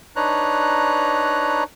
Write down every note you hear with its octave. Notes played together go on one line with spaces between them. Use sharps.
D4 D#4 B4 C#5 A#5 F#6